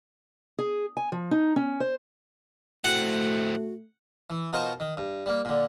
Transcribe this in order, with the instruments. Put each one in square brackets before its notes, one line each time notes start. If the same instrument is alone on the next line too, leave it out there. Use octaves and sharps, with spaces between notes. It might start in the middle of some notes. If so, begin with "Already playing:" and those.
[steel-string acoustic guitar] G#4
G#5
F3
D#4
C#4
C5
[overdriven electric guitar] A2 C4 [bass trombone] A3 [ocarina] F#4 [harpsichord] F#5
[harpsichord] E3
B2 D#4 F4 A#4 C5 C#6
D#3
G2
G3 A#3
A#2 D3